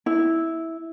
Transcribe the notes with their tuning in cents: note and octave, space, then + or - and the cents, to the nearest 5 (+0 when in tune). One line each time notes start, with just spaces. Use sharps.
E4 -10